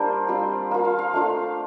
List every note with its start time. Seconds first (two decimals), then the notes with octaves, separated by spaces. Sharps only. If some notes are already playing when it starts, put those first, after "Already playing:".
Already playing: G3 A#3 D4 F4 C5 D5 F5 G5
0.28 G3 C4 F4
0.71 A#3 F4
0.85 F5
0.99 F5
1.13 A3 D4 F4